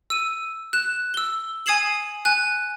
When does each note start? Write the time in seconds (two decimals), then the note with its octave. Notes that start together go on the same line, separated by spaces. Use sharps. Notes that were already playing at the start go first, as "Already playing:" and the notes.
0.10 E6 D#7
0.73 F#6 E7
1.14 E6 G7
1.66 G#5 D#6 G#6 C7 E7 F#7
2.25 G#5 F#6